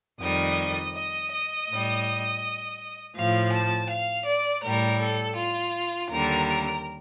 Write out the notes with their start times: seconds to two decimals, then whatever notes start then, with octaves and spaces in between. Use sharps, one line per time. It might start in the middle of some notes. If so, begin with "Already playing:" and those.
0.21 F2 D#3 G3 D#5
0.95 D#5
1.32 D#5
1.68 A2
1.73 G3
3.16 A2 F3 F5
3.53 A5
3.90 F5
4.26 D5
4.63 A2 G3 A#4
4.99 A4
5.36 F4
6.10 D#2 D3 G3 A#4